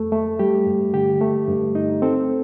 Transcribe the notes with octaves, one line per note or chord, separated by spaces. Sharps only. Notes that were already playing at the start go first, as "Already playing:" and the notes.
Already playing: F2 A3 A4
A3
G3 G4
G2
D3 G4
A3
G2
D#4
C4 A4